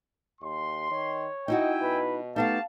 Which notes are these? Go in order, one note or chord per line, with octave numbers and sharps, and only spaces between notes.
D#2 C6
D#3 C#5
D#4 E4 F#4 D#5 E5 G5 G#5
B2 B4
A3 B3 D#4 G4 F5 A5